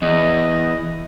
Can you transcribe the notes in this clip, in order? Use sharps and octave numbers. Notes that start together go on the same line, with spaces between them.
E2 D#5